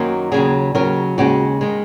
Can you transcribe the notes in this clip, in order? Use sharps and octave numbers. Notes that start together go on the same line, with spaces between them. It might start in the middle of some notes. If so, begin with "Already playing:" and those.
Already playing: F#2 D#3 F#3 A#3
D#2 C#3 F#3 G#4
D#2 C#3 F#3 A#4
D#2 C#3 G#3 C#4 F#4
D#3 G#3